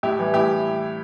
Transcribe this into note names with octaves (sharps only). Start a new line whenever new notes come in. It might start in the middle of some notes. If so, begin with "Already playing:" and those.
A2 E4 G4
E3 G3
A2 E4 G4